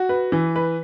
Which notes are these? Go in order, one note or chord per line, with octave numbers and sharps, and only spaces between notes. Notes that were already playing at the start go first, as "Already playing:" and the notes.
Already playing: F#4
B4
E3
B4